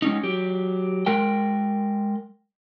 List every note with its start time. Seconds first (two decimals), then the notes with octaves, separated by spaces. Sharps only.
0.02 G#3 C#4 D#4
0.23 F#3 G4
1.06 G#3 A#4 G5